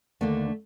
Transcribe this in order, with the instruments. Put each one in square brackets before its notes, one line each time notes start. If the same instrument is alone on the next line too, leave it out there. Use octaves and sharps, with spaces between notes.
[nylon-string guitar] D#2 D3 A3 A#3 D4